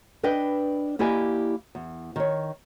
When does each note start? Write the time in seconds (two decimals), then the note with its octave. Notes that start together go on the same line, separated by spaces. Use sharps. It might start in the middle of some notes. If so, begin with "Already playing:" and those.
0.23 D4 B4 D#5 G5
0.99 A#3 E4 G4 D5 D#5 G#5
1.75 E2
2.16 D#3 C#5